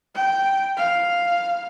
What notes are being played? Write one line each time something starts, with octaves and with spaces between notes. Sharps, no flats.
G5
F5